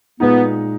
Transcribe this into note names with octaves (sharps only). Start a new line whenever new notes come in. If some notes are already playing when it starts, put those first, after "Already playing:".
A#2 G#3 B3 D#4